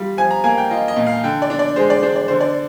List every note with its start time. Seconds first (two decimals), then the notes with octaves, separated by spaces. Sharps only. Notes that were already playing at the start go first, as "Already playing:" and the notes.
Already playing: G3 F4
0.17 F3 G#5
0.31 A#5
0.44 A#3 G#5
0.58 G5
0.71 F4 D#5
0.88 D#5
0.96 A#2
1.07 F5
1.24 D3 G5
1.42 D5
1.50 D4
1.59 D5
1.76 G#3 C5
1.90 D5
2.03 D4 C5
2.16 D5
2.28 D3 C5
2.41 D5